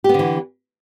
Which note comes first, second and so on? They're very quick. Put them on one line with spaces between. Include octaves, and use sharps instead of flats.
G4 B3 D3 E3